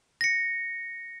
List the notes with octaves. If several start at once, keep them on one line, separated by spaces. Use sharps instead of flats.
A#6 C#7